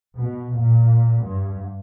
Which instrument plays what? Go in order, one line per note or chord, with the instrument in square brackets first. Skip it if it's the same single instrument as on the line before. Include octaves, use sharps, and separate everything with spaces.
[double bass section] B2
A#2
G2